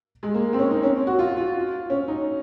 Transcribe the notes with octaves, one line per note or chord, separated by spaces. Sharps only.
G#3
A#3
C4
C#4
D#4
C#4
F#4
F4
F4
C#4
D#4